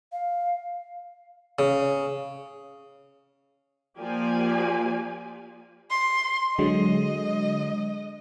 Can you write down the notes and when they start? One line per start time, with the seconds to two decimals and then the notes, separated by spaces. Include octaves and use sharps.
0.12 F5
1.59 C#3
3.98 F3 A#3 F4 G4 D5 G#5
5.91 C6
6.59 D3 F#3 G#3 D#5